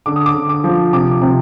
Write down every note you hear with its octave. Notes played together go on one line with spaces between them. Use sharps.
D3 D6
D#6
D6
D3
D6
F3
C3 D6
C3